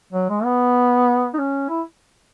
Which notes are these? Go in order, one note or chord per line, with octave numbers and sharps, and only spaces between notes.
F#3
G#3
B3
D#4
C#4
E4